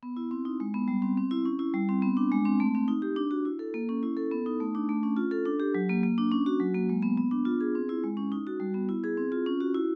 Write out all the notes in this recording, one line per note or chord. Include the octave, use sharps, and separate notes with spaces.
B3
E4
C4
D#4
G#3
B3
G3
C4
C4
E4
C#4
E4
G3
C4
B3
D4
G#3
C4
A3
C4
D#4
G4
D4
F#4
E4
A4
A#3
C#4
E4
A4
B3
D#4
A3
D4
A3
C#4
F4
A4
D4
G4
F#3
A#3
A#3
D4
C#4
F#4
F#3
A#3
G#3
B3
B3
D4
F4
G#4
C4
E4
G#3
C#4
D#4
F#4
G3
B3
E4
G#4
C4
F4
C#4
F#4
E4